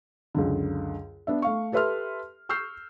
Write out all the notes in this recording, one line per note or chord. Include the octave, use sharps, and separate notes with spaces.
C#2 F#2 D3
B3 D4 E5
A3 F5 C#6
G4 A4 B4 E5 C6 F6
C#6 E6 F6 G6 C7